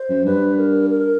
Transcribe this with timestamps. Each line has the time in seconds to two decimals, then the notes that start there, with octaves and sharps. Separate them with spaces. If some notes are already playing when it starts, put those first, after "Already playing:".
Already playing: C5
0.09 F#2
0.25 G2 B4
0.57 A#4
0.90 A#4